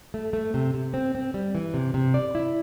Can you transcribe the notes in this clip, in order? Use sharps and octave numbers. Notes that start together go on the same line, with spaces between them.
A3
A3
C3
C3
C4
C4
G3
E3
C3
C3
D5
E4